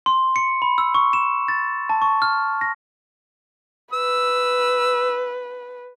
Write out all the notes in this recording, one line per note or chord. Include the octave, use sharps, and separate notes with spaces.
C6
C#7
B5
E6
C#6
E7
A6
A5
C#6
F6
A#6
B4 E6